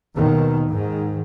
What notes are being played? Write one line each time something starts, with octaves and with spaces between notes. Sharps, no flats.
D#2 B2 D#3
G#2 D#3